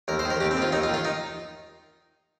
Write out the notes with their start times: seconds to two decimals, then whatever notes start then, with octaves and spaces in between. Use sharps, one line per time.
0.08 D#2 A#4
0.19 C5
0.25 D#3
0.30 A#4
0.40 D#2 G4
0.51 C4
0.57 D#3
0.62 F4
0.72 D#2 D#4
0.83 F4
0.89 D#3
0.94 F4
1.05 D#4